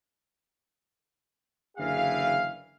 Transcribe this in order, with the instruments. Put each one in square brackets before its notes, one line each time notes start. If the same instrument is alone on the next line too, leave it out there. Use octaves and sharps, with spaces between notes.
[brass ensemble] F#1 D3 E3 G#4 F5